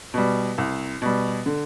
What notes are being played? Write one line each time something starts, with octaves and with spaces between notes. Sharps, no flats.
B2 G3
C2
B2 G3
D3